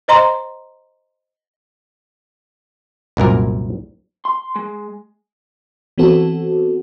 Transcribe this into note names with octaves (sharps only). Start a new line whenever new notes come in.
C5 D#5 A#5 C6
C2 F#2 A#2 A#4
C6
G#3
E3 B3 C4 F#4 A4